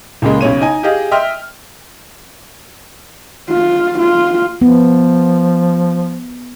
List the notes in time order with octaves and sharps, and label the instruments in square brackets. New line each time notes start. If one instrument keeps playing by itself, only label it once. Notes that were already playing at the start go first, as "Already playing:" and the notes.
[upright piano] C#2 A#2 C#3 G#3
B1 C#3 C#5 D#7
D#4 G#5
G4 G#4 D#5 F5
D#5 E5 G5 C6 F6
[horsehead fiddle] F4
F4
[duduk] F3 [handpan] B3